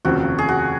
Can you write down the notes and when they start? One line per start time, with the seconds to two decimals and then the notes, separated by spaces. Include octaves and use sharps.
0.05 F1 D#2 C#3 F3 C4 F#4
0.38 G#4
0.49 F#4